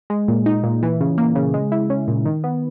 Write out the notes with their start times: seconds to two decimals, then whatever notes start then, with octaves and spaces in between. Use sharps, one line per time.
0.10 G#3
0.28 A#2
0.46 D#4
0.64 A#2
0.83 E3
1.01 C#3
1.18 A#3
1.35 C#3
1.54 G#3
1.72 E4
1.90 C#4
2.08 A#2
2.25 D#3
2.44 B3